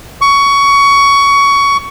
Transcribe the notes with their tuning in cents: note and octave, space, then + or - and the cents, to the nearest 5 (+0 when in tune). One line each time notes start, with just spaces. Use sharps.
C#6 +20